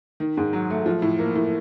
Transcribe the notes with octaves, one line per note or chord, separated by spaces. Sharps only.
D#3
G#2
F#3
A3
F3
A2
A#3
A2